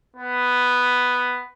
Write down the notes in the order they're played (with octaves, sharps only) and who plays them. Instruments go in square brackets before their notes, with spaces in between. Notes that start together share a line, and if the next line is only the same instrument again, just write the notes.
[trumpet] B3